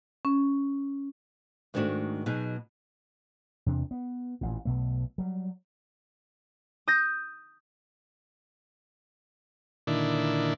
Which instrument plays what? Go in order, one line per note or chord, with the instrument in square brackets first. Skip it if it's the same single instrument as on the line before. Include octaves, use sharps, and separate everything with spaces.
[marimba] C#4
[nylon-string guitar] G#2 D#3 A3 D4 F#4
B2 F#3 D#4 G#4
[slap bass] E2 C3 D4
B3
A1 A#2
B1 B2 A3
F#3 G3
[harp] D#6 G6 A#6
[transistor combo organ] A#2 D3 D#3 D4 E4